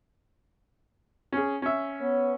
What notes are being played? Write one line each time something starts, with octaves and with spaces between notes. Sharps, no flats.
C#4 G#4
C#4 E5
B3 C#5